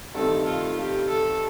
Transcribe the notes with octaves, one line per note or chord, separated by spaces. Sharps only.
G2 D#3 A3 C4 D#4 A4
F4
G4
A4